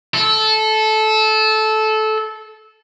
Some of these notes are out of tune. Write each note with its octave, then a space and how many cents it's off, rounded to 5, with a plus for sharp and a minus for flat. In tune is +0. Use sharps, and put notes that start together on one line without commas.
A4 -15